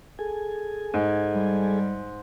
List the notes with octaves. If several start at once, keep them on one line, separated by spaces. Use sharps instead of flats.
G#4 A4 G#5
G#2
G3